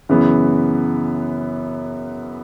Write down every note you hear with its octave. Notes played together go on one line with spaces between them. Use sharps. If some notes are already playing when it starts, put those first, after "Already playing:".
F#2 C#3 E3 B3